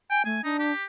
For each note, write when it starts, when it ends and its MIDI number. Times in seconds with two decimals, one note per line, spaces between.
0.10 0.23 79
0.10 0.23 80
0.25 0.41 57
0.25 0.42 80
0.44 0.72 62
0.44 0.57 63
0.59 0.84 67